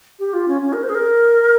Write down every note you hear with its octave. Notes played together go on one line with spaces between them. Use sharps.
G4
F4
C#4
C#4
A#4
C5
G#4
A#4